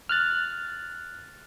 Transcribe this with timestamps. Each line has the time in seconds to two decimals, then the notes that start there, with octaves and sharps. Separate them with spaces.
0.09 F6 F#6 A6